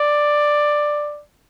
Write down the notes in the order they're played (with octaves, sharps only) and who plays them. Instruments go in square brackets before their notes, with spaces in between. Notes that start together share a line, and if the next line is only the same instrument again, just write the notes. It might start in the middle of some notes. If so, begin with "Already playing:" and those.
Already playing: [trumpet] D5